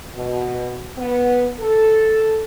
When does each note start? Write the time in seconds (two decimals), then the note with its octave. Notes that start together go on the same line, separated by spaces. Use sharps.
0.14 B2
0.98 B3
1.60 A4